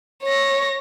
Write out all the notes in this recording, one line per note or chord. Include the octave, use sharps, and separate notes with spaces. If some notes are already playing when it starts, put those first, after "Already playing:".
C#5 A#6